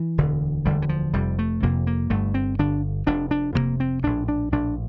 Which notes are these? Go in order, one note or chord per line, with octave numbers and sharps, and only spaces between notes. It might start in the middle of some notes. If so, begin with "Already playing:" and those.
Already playing: E3
E1 D2 D3
E1 D2 D3 G3
E3
F3
F1 F2 C3 G3
A3
F1 F2 C3 A#3
A#3
G1 G2 D3 A3
C4
G1 G2 D3 D4
F1 F2 C3 D4
D4
F1 F2 C3 A#3
C4
A#1 A2 D4
D4
A#1 A2 D4